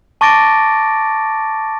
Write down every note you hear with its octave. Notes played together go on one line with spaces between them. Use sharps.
A5 C#6 D6 A6 A#6 D7